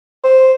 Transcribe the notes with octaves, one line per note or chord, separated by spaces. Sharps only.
C5